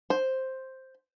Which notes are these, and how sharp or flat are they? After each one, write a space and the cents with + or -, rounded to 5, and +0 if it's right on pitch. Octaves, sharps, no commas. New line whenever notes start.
C5 +5